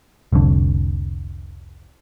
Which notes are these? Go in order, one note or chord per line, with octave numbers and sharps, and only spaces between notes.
F1 C2 F2 D3